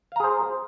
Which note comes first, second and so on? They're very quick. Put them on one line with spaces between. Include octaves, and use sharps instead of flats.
F5 A#5 G#4 C5